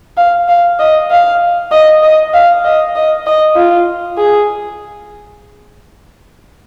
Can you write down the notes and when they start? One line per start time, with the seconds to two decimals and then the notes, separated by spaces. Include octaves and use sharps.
0.17 F5
0.49 F5
0.79 D#5
1.11 F5
1.72 D#5
2.03 D#5
2.34 F5
2.65 D#5
2.96 D#5
3.26 D#5
3.56 F4
4.18 G#4